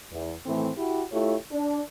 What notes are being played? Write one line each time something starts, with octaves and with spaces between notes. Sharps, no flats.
E2
A2 D#3 E3 A3 C4
E4 F#4 G4
A3 E4 F4 G4 C#5
D4